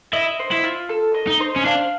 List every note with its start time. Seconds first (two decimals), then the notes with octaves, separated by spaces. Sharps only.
0.13 E4 D#5
0.39 C5
0.52 E4
0.63 F4
0.89 A4
1.14 D#5
1.27 D#4
1.40 C5
1.56 C#4
1.65 D4 F5